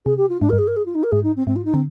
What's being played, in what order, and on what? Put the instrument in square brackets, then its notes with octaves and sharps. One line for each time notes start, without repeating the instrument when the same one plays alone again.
[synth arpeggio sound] C3 [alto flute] G#4
[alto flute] G4
F4
[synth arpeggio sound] G#2 [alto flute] D4
[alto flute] A#4
[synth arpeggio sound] G2
[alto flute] G#4
A#4
G#4
F4
D#4
A#4
[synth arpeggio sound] G#2 [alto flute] G#4
[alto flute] D#4
C4
[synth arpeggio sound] G#2 [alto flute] C4
[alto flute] F4
D#4
[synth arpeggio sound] D3 [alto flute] C4